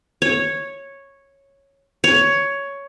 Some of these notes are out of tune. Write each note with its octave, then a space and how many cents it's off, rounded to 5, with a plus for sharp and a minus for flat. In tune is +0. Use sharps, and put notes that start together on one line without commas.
C#5 -5
C#5 +10